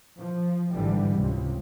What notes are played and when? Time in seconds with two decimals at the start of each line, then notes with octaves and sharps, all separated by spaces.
0.20 F3
0.73 G#1 G#2 D3 E3 G3
1.14 C#2 C3